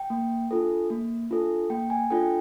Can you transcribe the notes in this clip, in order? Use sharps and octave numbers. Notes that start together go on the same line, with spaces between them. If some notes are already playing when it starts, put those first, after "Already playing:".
Already playing: G5
A#3
D4 F4 A4
A#3
D4 F4 A4
A#3 G5
G#5
D4 F4 A4 G5